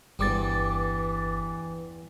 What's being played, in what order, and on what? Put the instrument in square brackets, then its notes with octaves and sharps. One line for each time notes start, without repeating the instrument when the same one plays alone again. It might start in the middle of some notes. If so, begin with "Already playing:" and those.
[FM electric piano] G1 D6 A6 [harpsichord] E2 G2 G3 [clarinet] E3